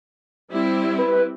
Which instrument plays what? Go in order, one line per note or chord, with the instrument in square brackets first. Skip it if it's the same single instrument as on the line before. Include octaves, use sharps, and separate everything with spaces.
[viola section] G3 C4 E4
[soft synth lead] B4